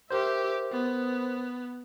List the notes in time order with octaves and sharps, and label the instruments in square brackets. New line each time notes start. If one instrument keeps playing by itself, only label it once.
[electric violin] G4 E5 [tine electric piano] A#4 C5
[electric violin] B3